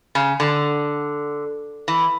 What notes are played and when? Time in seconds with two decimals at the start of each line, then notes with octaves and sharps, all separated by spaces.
0.15 C#3
0.40 D3
1.88 E3